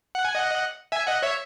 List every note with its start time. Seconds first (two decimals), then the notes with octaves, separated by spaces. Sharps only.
0.15 F#5
0.25 G#5
0.35 D#5 F#5
0.92 E5 G#5
1.07 D#5 F#5
1.22 C#5 E5